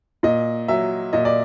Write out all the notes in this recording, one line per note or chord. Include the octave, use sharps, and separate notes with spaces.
A#2 D#5
F#3 E5
A#2 D#5
D5